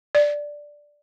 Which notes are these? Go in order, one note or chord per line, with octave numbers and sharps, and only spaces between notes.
D5